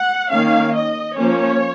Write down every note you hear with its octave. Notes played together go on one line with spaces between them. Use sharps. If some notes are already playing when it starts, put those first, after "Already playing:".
Already playing: F#5
D#3 A#3 C#4 F5
D#5
F3 A#3 C#4 C#5